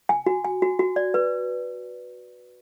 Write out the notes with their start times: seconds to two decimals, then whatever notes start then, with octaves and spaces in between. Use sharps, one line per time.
0.09 G#5
0.26 F#4
0.45 G#5
0.62 F#4
0.79 F#4
0.96 D5
1.14 B4